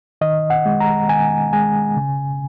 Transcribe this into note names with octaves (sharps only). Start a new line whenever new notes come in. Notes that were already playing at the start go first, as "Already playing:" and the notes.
D#3 D#5
F#5
G#3
A#5
D#3 G#5
G#3 G#5
C#3